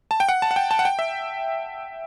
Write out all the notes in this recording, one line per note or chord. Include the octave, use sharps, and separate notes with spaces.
A5
G5
F#5
A5
F#5
G5
A5
F#5
G5
E5